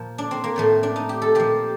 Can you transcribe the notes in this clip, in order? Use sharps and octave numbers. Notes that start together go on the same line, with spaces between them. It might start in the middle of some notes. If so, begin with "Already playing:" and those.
Already playing: A#2 F3
D4
C4
A#3
A2 F3 A3
D4
D#4
G4
A4
A#2 F3 G4